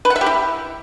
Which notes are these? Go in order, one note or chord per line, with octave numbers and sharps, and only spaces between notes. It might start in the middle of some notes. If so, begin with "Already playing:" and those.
B4
F#5
E5
G4
E4